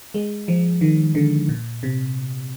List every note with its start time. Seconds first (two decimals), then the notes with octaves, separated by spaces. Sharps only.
0.14 G#3
0.48 F3
0.81 D#3
1.15 D3
1.49 A#2
1.83 C3